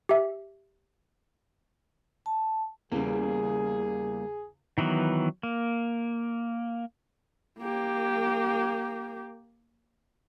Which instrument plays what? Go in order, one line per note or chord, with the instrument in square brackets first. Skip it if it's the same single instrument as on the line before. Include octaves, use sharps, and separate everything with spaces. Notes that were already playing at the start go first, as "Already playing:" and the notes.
[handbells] G4 E5
[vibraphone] A5
[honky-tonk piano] E2 C#3 [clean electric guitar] G3 A#3 [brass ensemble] G#4
[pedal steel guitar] D#3 E3 F#3 B3
A#3
[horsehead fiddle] A#3 G4